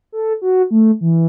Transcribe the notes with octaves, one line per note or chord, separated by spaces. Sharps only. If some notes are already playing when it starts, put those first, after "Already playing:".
A4
F#4
A3
E3